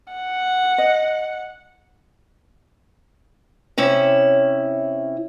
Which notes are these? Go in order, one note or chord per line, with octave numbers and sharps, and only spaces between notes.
F#5
D#5
C3 C#4 E4 E5